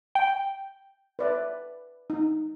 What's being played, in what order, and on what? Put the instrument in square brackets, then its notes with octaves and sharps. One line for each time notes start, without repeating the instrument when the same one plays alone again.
[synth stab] G5
[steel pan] B4 D5 E5
D#4